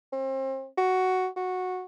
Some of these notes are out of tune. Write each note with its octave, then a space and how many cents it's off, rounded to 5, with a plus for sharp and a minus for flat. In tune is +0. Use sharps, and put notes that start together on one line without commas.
C4 +35
F#4 +5
F#4 -10